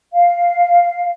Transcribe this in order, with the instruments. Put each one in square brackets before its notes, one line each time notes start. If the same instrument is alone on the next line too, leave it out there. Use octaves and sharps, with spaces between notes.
[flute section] F5